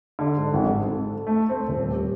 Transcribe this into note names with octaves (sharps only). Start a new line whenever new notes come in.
D3
G#2
G#1
G#2
A4
A3
C4
D#1
G4